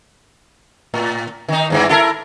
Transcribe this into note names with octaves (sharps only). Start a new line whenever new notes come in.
A2
D#3 D#4
E2 G2 E3
E4 A4 A#4